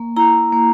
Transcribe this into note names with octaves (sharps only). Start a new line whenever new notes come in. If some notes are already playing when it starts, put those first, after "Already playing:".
Already playing: A#3
E4 A#5
A#3